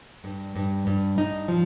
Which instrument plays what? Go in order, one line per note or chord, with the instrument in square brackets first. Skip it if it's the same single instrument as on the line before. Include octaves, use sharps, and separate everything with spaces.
[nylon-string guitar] G2
G2
G2
G2 D#4
F3